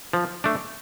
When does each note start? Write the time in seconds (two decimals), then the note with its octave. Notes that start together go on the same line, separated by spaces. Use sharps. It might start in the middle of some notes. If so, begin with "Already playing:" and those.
0.13 F3
0.44 A3 D4